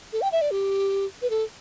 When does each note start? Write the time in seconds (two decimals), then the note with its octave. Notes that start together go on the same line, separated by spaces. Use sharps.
0.13 A4
0.22 G5
0.32 E5
0.41 D5
0.51 G4
1.22 B4
1.30 A4